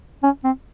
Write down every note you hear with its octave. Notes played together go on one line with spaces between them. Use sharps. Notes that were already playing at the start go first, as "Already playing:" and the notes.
C#4
C4